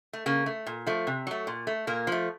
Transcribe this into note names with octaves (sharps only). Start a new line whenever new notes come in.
A3
C#3 A#3
A3
A#2
F3 A3
C3
F#3 A3
A#2
A3
A#2 A#3
F3 A3